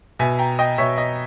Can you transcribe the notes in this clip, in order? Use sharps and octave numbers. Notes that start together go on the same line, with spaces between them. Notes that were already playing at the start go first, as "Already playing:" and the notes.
B2 E5 G#5
G5 A#5
D#5 G5
B2 C#5 E5
D#5